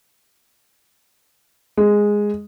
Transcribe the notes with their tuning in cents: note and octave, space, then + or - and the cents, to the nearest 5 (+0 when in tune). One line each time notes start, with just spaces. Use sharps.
G#3 -5